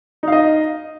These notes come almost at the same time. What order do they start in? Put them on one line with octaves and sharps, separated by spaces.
D#4 F5 D#5